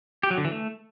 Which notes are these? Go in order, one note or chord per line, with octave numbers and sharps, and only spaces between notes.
G4
F#3
D3
E3
A3